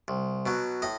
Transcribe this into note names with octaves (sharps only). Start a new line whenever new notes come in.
C2
B2 F#3
A2 D#5